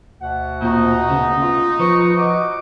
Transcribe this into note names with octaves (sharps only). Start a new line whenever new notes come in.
D2 B2 F#5
A#2 C4 D#4 F#4
C#3 B3
F4
F3 B4 C#6
F#4 D#5 F#5 D6